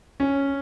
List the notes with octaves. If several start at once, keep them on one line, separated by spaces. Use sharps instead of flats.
C#4